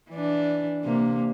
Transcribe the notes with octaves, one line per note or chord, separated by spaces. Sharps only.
E3 D4
C3 A#3